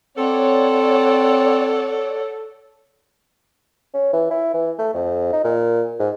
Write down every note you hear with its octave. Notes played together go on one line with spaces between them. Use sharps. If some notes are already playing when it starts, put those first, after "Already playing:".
C4 A4 C#5 D5 F#5
C#4
E3
E4
E3
A3
F2
D#4
A#2
G#2